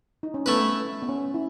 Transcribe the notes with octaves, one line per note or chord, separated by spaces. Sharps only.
D#4
C#4
A3 B3 E4 B4
B3
C#4
E4